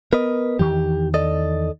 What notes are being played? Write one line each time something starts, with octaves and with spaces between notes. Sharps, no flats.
B3 A#4 B4 D#5
E2 D#3 E3 G4
A4 D5 D#5